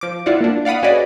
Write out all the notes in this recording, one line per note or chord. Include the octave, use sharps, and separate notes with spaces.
F3 D6
E4 F4 D5 F#5
A#3 D4
D5 F5 F#5 B5 D#6
C#4 F#4 G#4 B4 D5 D#5